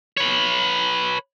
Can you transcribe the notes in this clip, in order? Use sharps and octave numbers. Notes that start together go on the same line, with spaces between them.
B4 C#5